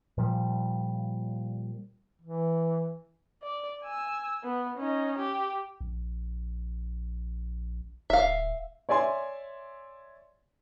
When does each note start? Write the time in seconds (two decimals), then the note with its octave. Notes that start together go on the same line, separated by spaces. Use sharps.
0.18 A#2 F3 G3
2.22 E3
3.42 D5
3.82 G#5 E6
4.43 B3
4.77 C#4 D#4
5.18 G4
5.81 A#1
8.10 D1 E5 F5
8.89 C#5 D5 E5 G#5 C6